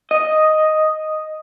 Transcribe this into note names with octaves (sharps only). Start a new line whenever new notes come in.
D#5